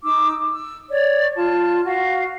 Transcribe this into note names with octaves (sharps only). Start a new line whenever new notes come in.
D#4 D6 E6
E6
C#5 D5
F4 A5
F#4 F5